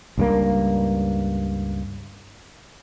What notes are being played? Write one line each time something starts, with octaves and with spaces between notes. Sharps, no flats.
C#2 G2 A#3